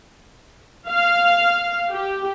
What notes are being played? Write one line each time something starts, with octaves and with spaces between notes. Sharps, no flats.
F5
G4